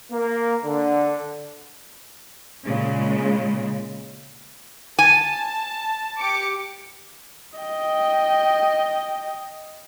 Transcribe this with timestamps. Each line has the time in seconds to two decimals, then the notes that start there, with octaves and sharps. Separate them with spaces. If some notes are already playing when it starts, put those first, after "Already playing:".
0.12 A#3
0.64 D3
2.65 A#2 C#3 G#3
4.99 G#5 A5
6.18 G4 D6 C#7
7.59 D#5 G5